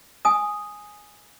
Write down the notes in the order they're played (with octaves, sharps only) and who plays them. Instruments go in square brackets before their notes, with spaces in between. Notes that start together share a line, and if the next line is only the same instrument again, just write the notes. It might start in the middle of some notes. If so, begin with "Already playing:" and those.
[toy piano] G#5 D#6